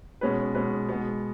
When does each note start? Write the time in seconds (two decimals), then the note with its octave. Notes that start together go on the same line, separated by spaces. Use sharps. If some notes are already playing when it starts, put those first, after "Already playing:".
0.21 B2 G#3 C#4 B4
0.55 B2 G#3 C#4 B4
0.89 B2 G#3 B3